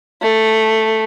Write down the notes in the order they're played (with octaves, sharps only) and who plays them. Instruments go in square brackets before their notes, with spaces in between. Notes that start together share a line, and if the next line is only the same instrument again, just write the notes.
[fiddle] A3